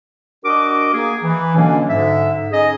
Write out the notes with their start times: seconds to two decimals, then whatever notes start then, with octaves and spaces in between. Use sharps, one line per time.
0.45 D4 F#4 A#4 D#5 D6
0.94 A#3 G#4
1.23 E3
1.55 B2 D3 F#3 A#3 C#4 D4
1.89 G#2 D3 E5
2.52 C#4 D#4 G#4 D#5